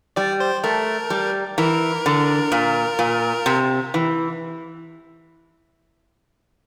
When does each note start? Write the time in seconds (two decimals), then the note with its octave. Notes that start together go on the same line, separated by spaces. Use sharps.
0.16 G3 D5
0.40 C5
0.64 A3 A#4
1.10 G3
1.58 E3 A#4
2.06 D3
2.52 A#2
2.99 A#2
3.46 C3
3.94 E3